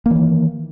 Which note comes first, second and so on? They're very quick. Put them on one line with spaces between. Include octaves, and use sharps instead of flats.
A#3 E3 D#3